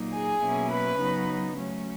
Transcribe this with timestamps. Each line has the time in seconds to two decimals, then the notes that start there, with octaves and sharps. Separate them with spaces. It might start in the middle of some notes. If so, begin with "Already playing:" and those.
Already playing: A#2 F#3 A#3 D#4
0.13 G#4 G#5
0.41 B2 F#3 A#3 C#4 E4
0.71 B4 B5
0.99 C#3 F#3 B3 D#4
1.57 F#3 A3 C#4